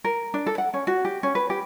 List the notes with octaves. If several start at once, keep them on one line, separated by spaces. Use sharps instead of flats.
A#4
D4
A4
F#5
C#4
F#4
G4
C#4
B4
G4